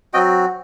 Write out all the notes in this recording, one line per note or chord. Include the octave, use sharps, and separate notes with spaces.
F#3 C4 F#4 D#5 G5